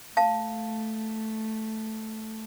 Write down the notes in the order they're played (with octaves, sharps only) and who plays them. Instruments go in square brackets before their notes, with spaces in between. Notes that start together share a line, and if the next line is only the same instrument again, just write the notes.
[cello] A3 [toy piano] F5 A5